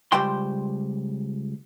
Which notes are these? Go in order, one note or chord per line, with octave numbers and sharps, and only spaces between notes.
C#2 G2 G3 C5 G5 C6